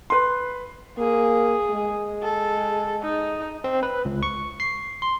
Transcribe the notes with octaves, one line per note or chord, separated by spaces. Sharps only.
B4 C6
A#3 G#4
G#3
A4
D#4
C4
B4
C#2
C#6
C7
C6